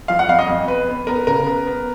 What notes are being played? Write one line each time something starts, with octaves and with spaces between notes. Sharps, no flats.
F3 F5
F#5
F2 F5
D#5
F2
B3 B4
B3
B3 A#4
C#3 A#4
B3
B3